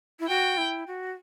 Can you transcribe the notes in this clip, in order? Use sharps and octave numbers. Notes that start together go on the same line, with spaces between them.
E4
F#4 G5
E4
F#4